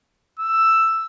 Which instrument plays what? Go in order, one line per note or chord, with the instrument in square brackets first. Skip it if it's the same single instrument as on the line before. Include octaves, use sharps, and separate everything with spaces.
[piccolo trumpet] E6